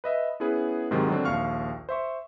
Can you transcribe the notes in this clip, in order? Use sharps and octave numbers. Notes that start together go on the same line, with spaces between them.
B4 D#5 E5
B3 C#4 E4 G#4 B4
G#2 C3 D#3 F#3 G#3
D3 F#3 C4 D4
A#1 D#2 F5 C#6 F6
C5 E5 C#6